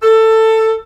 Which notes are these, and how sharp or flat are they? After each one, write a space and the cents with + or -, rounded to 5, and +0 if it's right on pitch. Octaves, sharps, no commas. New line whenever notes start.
A4 +15